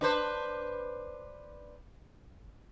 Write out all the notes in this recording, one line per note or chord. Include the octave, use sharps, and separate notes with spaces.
D4 B4 C5